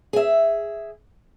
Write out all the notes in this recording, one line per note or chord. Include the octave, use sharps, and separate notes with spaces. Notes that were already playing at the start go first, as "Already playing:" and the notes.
G#4 E5